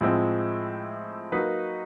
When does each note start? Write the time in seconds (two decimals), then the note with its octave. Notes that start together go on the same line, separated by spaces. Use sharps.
0.01 A2 F3 G#3 C4 E4
1.32 F#3 A#3 D#4 F#4 B4